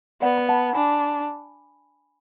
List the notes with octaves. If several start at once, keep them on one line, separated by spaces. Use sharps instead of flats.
B3 D5 F#5
B5
F#5 A5
D4 G#5 B5